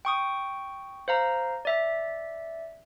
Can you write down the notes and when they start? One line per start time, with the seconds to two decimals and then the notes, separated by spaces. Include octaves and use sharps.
0.05 G5 C#6 D#6
1.08 C5 F5 A#5
1.65 D5 E5